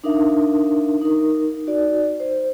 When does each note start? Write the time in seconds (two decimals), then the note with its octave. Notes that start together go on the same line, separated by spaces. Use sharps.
0.04 D4 D#4 A#4 E5 F5
1.02 D#4 A#4
1.67 D#4 F#4 D5
2.20 C5